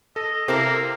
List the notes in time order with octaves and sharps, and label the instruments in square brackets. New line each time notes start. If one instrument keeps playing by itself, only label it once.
[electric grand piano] A4 [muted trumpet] D#5
[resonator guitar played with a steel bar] C3 E4 A#4 [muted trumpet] A#3 [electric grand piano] G4 A4 C5